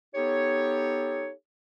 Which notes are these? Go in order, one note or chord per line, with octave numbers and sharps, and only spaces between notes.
B3 D#4 G4 A4 C#5